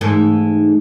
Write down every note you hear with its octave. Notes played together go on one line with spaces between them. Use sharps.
G#2 E3 A3